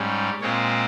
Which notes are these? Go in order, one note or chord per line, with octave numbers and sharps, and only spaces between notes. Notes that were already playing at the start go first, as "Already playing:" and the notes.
Already playing: G#2 G3 C#4
A#2 G#3 C4 C#5